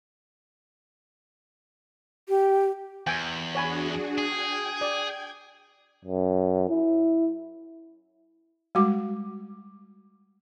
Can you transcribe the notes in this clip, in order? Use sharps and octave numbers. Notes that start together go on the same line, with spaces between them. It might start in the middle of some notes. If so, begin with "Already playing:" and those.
G4
E2 G5 G#5
D4 F#4 G#4 C#5 G#5 B5
G#4 G5 G#6
D5
F#2
E4
G3 G#3 F#4 D6